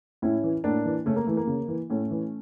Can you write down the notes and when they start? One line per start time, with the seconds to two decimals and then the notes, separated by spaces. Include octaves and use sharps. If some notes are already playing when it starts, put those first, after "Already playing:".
0.22 A2 C#4 E4
0.44 E3
0.64 A2 A#3 D4
0.85 E3
1.06 C#3 A3 C#4
1.16 A#3
1.27 E3 A3
1.37 A#3
1.47 C#3
1.68 E3
1.90 A2 A3 C#4
2.11 E3